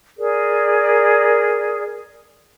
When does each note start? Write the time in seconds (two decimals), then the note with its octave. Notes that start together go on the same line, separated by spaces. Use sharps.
0.18 G#4 A#4 D5